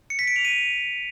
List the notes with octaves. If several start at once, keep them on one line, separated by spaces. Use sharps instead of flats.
C#7
B6
D7
F7
D#7